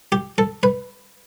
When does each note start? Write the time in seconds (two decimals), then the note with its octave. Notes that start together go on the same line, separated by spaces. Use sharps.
0.12 G4
0.38 A4
0.63 B4